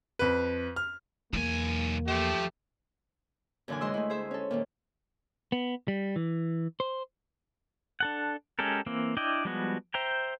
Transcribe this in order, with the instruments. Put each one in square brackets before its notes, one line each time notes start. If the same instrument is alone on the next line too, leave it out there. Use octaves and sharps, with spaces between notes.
[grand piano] F2 B4
F6
[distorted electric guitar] B1 G#5 [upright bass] E2 [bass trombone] A#3
[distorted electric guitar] F3 C5 [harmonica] A3 G4
[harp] F#2 A#2 D3 E3 D5 G#5
D2 G#3 D#5 C6 E6
A3 E4
G#4 C5 E5
C#4 A4
A#2 D#3 A#3
[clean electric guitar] B3
G3
E3
C5
[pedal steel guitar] D4 A4 F#5
G#3 C#4 G4 A4 A#4
E3 A#3 C4
D4 E4 D5 D#5 G5
F3 G3 G#3 B3 F#4
C5 E5 G5 A#5